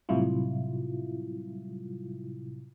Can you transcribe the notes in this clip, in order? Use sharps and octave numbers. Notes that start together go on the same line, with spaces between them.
A2 C3 F#3 G3 E4 F4